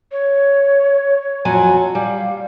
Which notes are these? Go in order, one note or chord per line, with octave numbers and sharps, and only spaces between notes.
C#5
F2 F#3 G#5
G3 F5